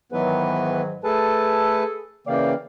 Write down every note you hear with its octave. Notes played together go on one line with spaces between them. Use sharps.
G#2 D#3 E3 F#3 B3 B4
A3 G#4 A4 B4 A5
C#3 E3 A#3 D5 F5 G5